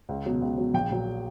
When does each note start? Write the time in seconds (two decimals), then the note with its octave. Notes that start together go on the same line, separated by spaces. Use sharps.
0.09 C#2
0.26 B2 F#3
0.42 C#2
0.58 B2 F#3
0.74 A#1 G5
0.90 A#2 F#3